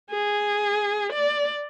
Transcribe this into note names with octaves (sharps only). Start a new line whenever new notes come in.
G#4
D5